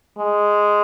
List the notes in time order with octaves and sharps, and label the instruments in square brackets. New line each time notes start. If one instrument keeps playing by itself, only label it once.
[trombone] G#3